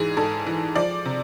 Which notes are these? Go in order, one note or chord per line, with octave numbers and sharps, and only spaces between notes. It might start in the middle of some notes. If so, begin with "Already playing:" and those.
Already playing: G#2 E3 G#4
G#2 A4
E3
F3 D5
C3